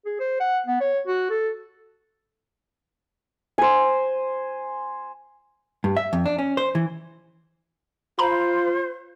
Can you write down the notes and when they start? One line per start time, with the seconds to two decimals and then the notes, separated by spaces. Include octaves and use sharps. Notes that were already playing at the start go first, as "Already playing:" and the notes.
0.05 G#4
0.20 C5
0.40 F#5
0.67 B3
0.80 C#5
1.07 F#4
1.30 A4
3.58 C5 G#5
5.84 G2
5.97 E5
6.13 F2
6.26 D4
6.38 C#4
6.57 C5
6.75 E3
8.19 F4 C5 A#5 B5